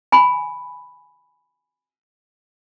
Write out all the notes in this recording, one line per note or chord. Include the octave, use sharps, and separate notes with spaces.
G#5 B5